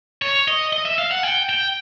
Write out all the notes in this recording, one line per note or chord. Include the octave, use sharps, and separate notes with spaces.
C#5
D#5
D#5
E5
F5
F#5
G5
G5